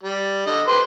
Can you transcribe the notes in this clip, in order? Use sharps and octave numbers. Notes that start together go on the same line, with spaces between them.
G3
D3 D#5
G4 B4 C5